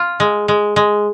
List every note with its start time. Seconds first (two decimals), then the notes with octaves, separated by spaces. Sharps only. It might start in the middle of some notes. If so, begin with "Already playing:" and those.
Already playing: F4
0.20 G#3
0.48 G#3
0.76 G#3